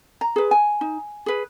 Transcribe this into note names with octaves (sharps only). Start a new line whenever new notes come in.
A#5
G#4 B4
G#5
D#4
G#4 B4